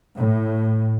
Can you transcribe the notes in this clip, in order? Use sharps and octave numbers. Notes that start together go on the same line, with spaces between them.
A2